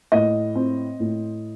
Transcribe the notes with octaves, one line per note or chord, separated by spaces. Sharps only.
A2 D#5
C4
A2